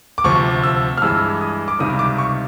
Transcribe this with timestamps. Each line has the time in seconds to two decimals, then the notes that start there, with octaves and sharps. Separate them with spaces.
0.18 D6
0.24 D2 C3 F3 C#6
0.63 E6
0.98 F6
1.02 G2 E3 G#3 E6
1.41 D#6
1.68 D6
1.79 C#2 C3 D#3 G3 D#6
1.99 D6
2.18 C#6